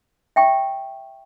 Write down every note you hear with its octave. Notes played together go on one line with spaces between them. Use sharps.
E5 G5 C#6